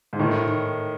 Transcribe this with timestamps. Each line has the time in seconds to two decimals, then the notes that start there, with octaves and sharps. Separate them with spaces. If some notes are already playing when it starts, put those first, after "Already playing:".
0.13 G#2
0.19 A2 D#3